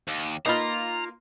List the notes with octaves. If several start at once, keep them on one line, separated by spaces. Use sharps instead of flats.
D#2
A#3 D#4 F4 B4 A#5 B5